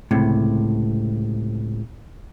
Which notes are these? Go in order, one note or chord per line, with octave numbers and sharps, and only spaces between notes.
C#2 A2 C3